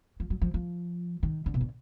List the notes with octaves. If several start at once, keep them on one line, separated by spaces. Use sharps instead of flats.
F3
F#3
F3
F3
D#3
D3
B2
D3